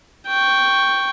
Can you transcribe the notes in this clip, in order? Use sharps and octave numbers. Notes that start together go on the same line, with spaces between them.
G5 C#6